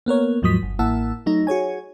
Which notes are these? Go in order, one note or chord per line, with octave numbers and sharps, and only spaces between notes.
A#3 B3 A#4 C#5
D#2 G#2 F3 F#3 D#6 B6
G1
A1 A#3 E4 F#5 A5 E6
F#3 A3 D#4
F#4 G#4 C#5 G#5